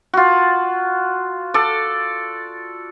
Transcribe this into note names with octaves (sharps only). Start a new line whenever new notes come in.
F4 F#4
A4 D5